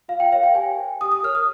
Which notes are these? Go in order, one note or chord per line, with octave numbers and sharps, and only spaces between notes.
F4 F5
G5
A#4 C#5 F5
G5
G4 G#5
C5
G4 D#6
D#6
A#4 C#5 F6
D#6